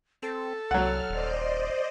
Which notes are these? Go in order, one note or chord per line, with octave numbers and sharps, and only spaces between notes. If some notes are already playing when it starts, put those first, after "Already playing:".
C4 A4
C2 F#3 F#5 F6
D#1 C5 D5 D#5